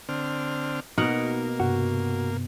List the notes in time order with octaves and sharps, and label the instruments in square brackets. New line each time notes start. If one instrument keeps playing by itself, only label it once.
[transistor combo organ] D3 C4 F6
[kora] B2 A#4 F#5 [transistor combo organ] A#3 [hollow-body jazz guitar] D#4
[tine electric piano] G2 C3 [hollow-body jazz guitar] F#4